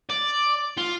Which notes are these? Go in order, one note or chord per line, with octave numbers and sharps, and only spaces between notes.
D5
F4